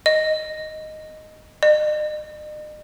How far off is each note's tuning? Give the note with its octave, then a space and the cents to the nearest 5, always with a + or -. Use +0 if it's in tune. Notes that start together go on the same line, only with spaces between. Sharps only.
D#5 -5
D#5 -45